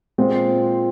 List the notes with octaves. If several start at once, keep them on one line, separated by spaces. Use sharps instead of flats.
A#2 G#3 C4 F4 C5